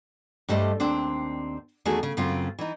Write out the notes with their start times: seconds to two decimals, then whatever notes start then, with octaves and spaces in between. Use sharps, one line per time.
0.49 G2 G3 A3 C5 D#5
0.80 D#2 C4 D4 C5
1.85 E2 D#3 A3 F#4 G#4
2.03 C#3
2.17 F#2 C#3 C4 F4
2.59 E3 D#4